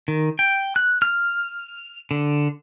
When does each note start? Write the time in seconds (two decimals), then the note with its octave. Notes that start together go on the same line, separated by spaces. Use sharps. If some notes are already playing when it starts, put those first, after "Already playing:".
0.08 D#3
0.39 G5
0.76 F#6
1.02 F6
2.11 D3